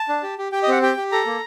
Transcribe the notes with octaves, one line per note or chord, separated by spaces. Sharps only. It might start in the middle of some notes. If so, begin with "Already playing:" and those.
Already playing: A5
D4
G4
G4
G4 G5
D#5
C4 F#5
G4 G5
G4
A4 A#5
A#3